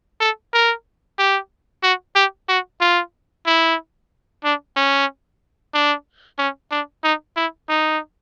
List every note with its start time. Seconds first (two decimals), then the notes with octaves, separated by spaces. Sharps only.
0.20 A4
0.53 A#4
1.19 G4
1.83 F#4
2.16 G4
2.49 F#4
2.81 F4
3.46 E4
4.44 D4
4.76 C#4
5.74 D4
6.38 C#4
6.71 D4
7.04 D#4
7.36 E4
7.69 D#4